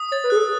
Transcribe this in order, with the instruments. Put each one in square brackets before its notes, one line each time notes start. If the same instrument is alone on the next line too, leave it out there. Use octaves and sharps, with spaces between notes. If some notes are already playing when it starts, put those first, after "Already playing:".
Already playing: [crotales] D#6
[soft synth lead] C#5 [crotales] A6
[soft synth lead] B4
[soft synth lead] G#4 [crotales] F#6
[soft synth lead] A4